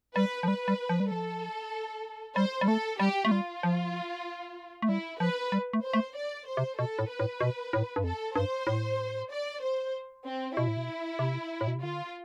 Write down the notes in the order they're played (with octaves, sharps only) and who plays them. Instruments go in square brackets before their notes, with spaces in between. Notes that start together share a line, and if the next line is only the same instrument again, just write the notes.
[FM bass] G3 [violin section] B4
[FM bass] F3
[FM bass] G3 [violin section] B4
[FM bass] G3
F3
G3
[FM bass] F3 [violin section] A4
[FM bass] G3 [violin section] C5
[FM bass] G3
[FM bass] A3 [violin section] A4
[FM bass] G3 [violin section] G4
[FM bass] A3
[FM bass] G3 [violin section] F4
[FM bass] F3
A3
[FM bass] G3 [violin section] E4
[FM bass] F3 [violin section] B4
[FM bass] G3
A3
[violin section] C5
[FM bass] A3
[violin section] D5
C5
[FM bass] C3
[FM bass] B2 [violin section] A4
[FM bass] A2
[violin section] B4
[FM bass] A2
B2
A2
G2
[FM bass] F2 [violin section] A4
[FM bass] G2 [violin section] C5
[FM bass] A2
[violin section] D5
C5
C4
[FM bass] B2 [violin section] E4
[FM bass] A2
B2
C3
A2
B2
C3
[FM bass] D3 [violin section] F4